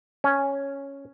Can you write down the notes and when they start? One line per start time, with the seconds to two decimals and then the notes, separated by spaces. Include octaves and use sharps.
0.24 C#4